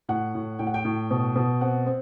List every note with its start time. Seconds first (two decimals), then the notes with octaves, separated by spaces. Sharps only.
0.09 A2 F#5
0.35 A2
0.59 A2 G5
0.67 F#5
0.74 G5
0.85 A2
1.11 B2
1.36 B2
1.61 C4 F#5
1.86 C4